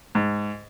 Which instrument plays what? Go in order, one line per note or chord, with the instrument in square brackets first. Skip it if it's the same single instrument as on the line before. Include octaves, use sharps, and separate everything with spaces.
[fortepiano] G#2